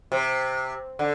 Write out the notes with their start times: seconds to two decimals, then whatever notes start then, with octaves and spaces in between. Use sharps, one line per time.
0.12 C3
0.99 D3